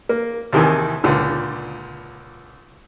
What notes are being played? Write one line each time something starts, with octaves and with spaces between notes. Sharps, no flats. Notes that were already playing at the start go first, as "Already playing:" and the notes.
A#3
D#2 C3 D#3 E3 G#5
C#2 A#2 D3